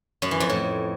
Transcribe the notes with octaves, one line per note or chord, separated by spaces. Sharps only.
F#2
E3
F2
A2